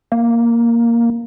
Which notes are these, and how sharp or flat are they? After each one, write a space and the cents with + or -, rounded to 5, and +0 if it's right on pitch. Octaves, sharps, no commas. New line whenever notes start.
A#3 +0